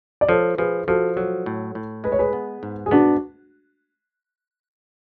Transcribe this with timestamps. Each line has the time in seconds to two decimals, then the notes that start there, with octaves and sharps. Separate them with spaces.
0.21 D5
0.29 F3 A4 C#5
0.58 F3 G#4 B4
0.88 F3 F#4 A4
1.16 F#3 F#4 A4
1.46 A2
1.75 A2
2.04 G#3 B4
2.12 C#5
2.19 G#4 B4
2.33 B3
2.63 G#2
2.86 G#4
2.91 B3 D4 F#4